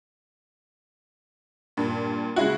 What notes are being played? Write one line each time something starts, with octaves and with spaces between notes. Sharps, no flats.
G2 A#2
C#3 G#3 E4 F#4